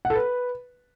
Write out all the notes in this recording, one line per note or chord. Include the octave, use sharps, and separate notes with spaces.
F#5
A4
B4